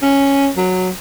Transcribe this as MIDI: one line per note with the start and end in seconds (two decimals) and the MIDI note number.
0.02 0.50 61
0.57 0.90 54